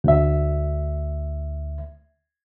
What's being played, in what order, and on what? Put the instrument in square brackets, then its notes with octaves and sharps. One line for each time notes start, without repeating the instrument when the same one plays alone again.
[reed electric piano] D2 E5